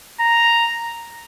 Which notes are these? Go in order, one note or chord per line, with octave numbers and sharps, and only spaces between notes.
A#5